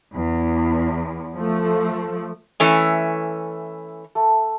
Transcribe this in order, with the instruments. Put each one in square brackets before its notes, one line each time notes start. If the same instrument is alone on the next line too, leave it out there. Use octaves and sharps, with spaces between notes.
[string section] E2
F3 A3
[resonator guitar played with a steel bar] E3 A3 C#4
[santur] A3